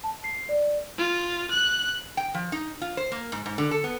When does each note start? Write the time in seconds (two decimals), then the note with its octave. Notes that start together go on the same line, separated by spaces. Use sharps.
0.04 A5
0.24 C7
0.49 D5
0.98 F4
1.51 F#6
2.17 G5
2.34 F3
2.52 D#4
2.81 F4
2.97 C5
3.12 A#3
3.32 G#2
3.46 G#2
3.58 D3
3.71 A4
3.84 B3